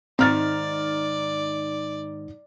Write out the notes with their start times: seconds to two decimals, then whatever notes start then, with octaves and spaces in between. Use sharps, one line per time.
0.19 G#2 D#3 C4 D5 A#5 F6 A6